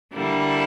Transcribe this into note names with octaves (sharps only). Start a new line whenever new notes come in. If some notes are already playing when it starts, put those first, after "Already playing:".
D3 G3 A#3 E4